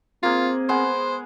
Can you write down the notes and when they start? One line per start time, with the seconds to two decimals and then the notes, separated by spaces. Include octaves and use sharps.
0.23 A#3 C4 F4 G#4
0.69 G#3 B3 C5 F#5